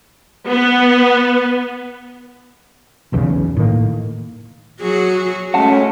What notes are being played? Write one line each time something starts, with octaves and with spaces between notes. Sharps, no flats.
B3
F#1 B1 E2 C#3
A2 D#3 A#3
F#3 F#4 G#4
G#3 A3 C#4 F#5 A5